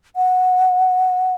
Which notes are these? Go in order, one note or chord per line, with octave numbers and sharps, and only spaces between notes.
F#5